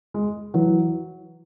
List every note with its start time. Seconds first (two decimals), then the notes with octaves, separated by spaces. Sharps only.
0.14 G#3
0.54 E3 F#3